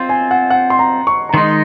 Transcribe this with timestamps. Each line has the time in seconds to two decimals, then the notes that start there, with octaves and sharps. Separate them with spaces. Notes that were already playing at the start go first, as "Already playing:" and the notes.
Already playing: C4 F4 C5 C6
0.09 G#5
0.31 F#5
0.50 F#5
0.70 C6
0.79 A#5
1.07 C#6
1.29 A#5
1.34 D#3 G#3 D#4 C6